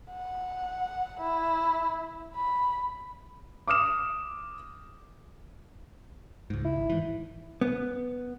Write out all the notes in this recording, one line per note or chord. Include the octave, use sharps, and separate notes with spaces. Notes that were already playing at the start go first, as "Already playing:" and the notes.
F#5
E4
B5
D6 D#6 F6 E7
C#2 G#2
E4
G#1
G#2 E3
B3